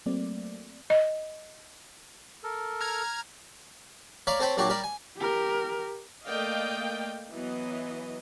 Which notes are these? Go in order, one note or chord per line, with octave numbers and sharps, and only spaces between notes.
F#3 A3 A#3 C4 D5
D#5
A4 A#4
A#5 F6 G#6
C#5 D5 F5 A#5 B5
C4 A4 C5 C#5 G5 B5
A#2 F#3 D4 G4 C#5
G3 A#4 D5 B5
G#5
G4 A#4
A3 A#3 D5 D#5 F5 G5
E3 F#3 B3 D#5